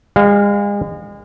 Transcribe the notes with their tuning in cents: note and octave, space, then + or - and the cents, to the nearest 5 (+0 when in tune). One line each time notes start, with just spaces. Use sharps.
G#3 -35 F5 +0